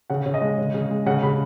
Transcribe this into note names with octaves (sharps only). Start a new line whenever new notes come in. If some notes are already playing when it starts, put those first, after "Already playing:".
C#3 F#5
C#3
D#5
G#3
C#3
C#3
G#3
C#3 F#5
C#3 B5